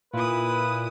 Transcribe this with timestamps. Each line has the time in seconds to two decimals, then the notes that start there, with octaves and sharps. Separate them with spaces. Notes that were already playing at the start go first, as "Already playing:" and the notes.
0.13 A#2 E4 B4 D#6